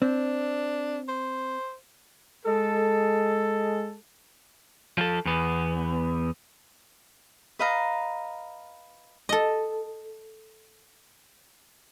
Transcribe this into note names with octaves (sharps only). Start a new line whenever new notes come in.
C4 D4
C5
G#3 A4
F3 A4
E2 B3
B4 D#5 F5 A#5
A4 D#5